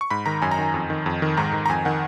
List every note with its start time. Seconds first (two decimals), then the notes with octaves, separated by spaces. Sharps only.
0.01 C#6
0.10 G#2 B5
0.26 D#3 A#5
0.42 F#2 G#5
0.51 A#5
0.59 D#3 G#5
0.74 F2
0.90 D#3
1.06 F2
1.22 D#3
1.37 G#2 A#5
1.53 D#3
1.66 A#5
1.69 F2 G#5
1.85 D#3 F#5